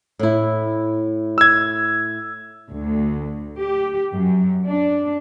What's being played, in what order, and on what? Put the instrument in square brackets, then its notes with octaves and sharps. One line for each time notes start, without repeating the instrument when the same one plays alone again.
[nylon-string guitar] A2 E4
[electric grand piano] E6 G#6
[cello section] D2
G4
F#2
D4